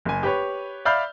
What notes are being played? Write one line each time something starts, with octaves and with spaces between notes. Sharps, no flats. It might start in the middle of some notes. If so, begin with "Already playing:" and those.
F#1 G#5
G4 B4 C#5
D5 E5 F5 B5 F6 G6